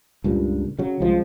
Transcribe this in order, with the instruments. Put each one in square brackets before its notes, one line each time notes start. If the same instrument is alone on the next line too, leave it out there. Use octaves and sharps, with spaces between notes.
[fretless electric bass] C#2 G2 A#2
C#3 F#3
C2 C#3 F3 G#3